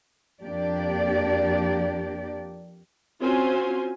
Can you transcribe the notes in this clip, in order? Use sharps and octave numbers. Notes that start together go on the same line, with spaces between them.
F2 A#3 D4 G4 D5
C4 C#4 F4 F#4 C5 G#5